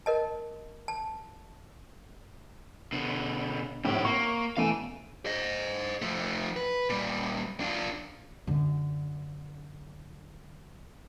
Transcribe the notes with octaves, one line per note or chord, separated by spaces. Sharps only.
A#4 D#5 A5
A5
B2 D3
G#1 F2 A2 G4
A#3 C#6
B2 E3 A3 F5 G#5
C5 D#5
F3 A3
B4
A#2 G3
D4 F4
F#2 D3